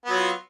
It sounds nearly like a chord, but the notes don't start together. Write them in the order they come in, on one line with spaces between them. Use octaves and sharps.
B3 F#3 F4